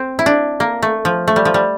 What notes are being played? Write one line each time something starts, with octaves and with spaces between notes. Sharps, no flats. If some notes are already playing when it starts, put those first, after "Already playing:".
Already playing: C4
E4
D4
A#3
A3
F3
A3
G3
F3
G3